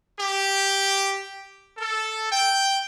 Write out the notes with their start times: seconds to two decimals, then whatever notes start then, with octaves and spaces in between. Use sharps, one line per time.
0.18 G4
1.78 A4
2.31 G5